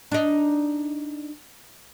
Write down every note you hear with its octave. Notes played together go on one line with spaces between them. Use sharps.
D4 D#4